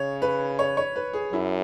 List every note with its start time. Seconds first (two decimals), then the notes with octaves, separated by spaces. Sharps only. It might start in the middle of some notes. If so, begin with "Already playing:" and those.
Already playing: C#3 C#5
0.22 B4
0.59 C#5
0.77 C#5
0.96 B4
1.13 G#4
1.32 F#2 E4